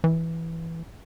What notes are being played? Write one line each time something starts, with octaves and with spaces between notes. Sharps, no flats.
E3